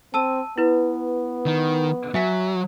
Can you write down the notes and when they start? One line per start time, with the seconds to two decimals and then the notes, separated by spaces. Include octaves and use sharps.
0.14 C4 A5 E6 D#7
0.58 B3 E4 B4
1.46 D#3
2.14 F#3 E5 G#5 B6